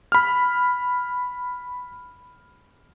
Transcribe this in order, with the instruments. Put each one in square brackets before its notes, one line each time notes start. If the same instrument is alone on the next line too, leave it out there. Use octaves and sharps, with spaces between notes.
[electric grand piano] B5 F6